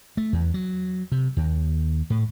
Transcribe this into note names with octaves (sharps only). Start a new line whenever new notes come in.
A3
E2
F#3
C3
D#2
A2